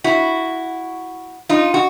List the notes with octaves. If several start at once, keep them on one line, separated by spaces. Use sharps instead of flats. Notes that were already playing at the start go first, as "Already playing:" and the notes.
E4 F#4
D#4 F4
F#4